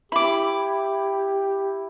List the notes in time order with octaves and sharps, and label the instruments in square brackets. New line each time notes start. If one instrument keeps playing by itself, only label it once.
[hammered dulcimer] E4 [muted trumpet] G4 [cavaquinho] B5 D6